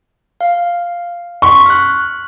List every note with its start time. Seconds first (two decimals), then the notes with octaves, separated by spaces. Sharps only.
0.41 F5
1.42 C6 C#6 B6
1.66 F6 F#6